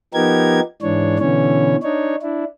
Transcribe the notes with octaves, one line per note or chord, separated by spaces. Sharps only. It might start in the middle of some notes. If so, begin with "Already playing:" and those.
F3 B3 D#4 G4 A#4 G#6
G#2 E3 D4 C#5
B2 D3 E3 C#4 C#5
D4 D#4 C#5
D4 E4